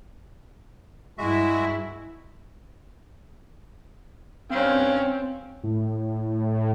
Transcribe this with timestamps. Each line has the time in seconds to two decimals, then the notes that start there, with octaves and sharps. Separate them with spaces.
1.18 G2 G#3 E4 F#4 E5
4.51 G2 C4 C#4 F5
4.82 C4
5.63 A2